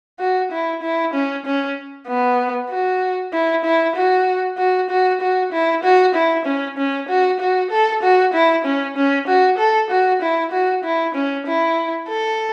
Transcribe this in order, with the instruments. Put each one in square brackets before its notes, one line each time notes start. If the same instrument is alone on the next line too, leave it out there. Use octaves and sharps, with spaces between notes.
[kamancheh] F#4
E4
E4
C#4
C#4
B3
F#4
E4
E4
F#4
F#4
F#4
F#4
E4
F#4
E4
C#4
C#4
F#4
F#4
A4
F#4
E4
C#4
C#4
F#4
A4
F#4
E4
F#4
E4
C#4
E4
A4